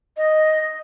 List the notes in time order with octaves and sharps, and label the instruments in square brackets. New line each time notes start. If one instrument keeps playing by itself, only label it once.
[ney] D#5